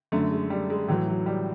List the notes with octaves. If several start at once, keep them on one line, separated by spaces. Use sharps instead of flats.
F#2 D3 A3
G#3
G3
G#3
A2 E3 F#3
F#3
G3